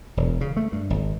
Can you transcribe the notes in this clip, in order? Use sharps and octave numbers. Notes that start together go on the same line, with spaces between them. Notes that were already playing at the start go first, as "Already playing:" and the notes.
E1
C#3
A3
G2
G#1